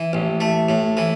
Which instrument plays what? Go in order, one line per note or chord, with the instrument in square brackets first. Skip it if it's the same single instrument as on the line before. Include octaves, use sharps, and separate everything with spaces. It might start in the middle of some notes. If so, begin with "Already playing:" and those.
Already playing: [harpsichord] E3
A1
A3
A2
E3